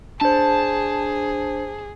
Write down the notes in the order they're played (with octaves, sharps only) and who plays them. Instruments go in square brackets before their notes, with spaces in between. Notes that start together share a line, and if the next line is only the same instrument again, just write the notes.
[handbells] D4 C5 [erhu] G#4 [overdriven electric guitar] A5